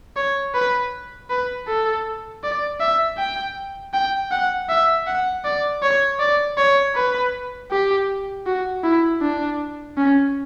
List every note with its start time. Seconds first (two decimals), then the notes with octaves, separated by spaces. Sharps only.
0.16 C#5
0.54 B4
1.30 B4
1.68 A4
2.44 D5
2.80 E5
3.18 G5
3.94 G5
4.31 F#5
4.69 E5
5.07 F#5
5.45 D5
5.82 C#5
6.20 D5
6.57 C#5
6.95 B4
7.71 G4
8.46 F#4
8.84 E4
9.21 D4
9.97 C#4